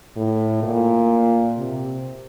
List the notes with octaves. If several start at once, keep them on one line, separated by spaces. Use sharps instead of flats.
A2
A#2
C3